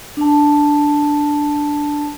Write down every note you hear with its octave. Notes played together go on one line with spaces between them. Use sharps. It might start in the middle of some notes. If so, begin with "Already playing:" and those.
D4 A5